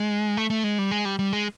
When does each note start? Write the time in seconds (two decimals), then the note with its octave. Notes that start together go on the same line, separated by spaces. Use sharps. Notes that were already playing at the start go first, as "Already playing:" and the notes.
Already playing: G#3
0.37 A3
0.50 A3
0.64 G#3
0.79 G3
0.91 G#3
1.05 G3
1.19 G3
1.33 G#3